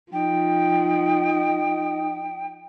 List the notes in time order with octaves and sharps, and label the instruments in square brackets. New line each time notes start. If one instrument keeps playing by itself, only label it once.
[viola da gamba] F3 [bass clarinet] D#4 [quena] G5